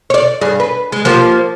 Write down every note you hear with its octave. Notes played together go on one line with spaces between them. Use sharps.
C#5 D5
G2 G#4
B4
G#3
F3 A#3 G4